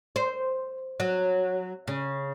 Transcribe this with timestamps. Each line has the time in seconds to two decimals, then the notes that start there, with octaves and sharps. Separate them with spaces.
0.16 C5
1.00 F#3
1.88 C#3